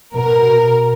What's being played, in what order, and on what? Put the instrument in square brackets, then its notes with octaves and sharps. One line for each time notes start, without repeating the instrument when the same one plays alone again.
[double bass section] B2 [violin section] A#4